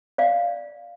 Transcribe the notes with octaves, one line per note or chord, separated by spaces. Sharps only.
D5 F5